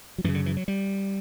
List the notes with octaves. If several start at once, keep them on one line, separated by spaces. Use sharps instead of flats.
F#3
F#2 C#3 E3
D3
E3
F#3
G3